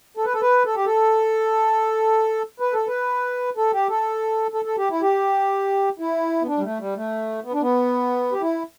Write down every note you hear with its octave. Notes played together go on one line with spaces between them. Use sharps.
A4
B4
A4
B4
A4
G4
A4
B4
A4
B4
A4
G4
A4
A4
A4
G4
E4
G4
E4
B3
D4
G3
A3
G3
A3
B3
D4
B3
G4
E4